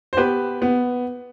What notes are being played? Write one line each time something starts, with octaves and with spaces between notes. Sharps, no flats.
C5
B3 G4 B4
B3